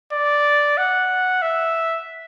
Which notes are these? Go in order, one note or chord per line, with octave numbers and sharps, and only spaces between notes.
D5
F#5
E5